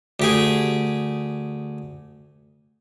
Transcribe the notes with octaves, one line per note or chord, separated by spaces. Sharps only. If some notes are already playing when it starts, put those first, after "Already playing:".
D2 G4 G#4